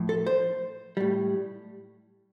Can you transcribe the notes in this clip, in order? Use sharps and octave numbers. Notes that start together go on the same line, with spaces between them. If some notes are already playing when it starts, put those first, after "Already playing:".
Already playing: A2 F3
A4
C5
A2 G3